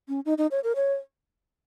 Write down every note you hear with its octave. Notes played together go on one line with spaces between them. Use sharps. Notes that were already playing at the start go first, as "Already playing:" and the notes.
C#4
D#4
D#4
C#5
A#4
C#5